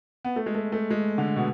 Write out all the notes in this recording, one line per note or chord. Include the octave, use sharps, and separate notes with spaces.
B3
A3
G#3
A3
A3
G#3
D3
B2